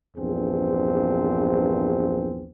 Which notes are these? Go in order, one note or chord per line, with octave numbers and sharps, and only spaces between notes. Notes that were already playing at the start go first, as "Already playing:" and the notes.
A#1 E2 G2 C4 G#4